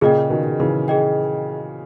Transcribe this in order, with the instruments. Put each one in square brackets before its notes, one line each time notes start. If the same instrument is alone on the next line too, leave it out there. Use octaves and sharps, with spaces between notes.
[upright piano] A#2 C#3 [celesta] G#4 D#5 G5
[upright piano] B2 D#3
C#3 E3
[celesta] G#4 D#5 G5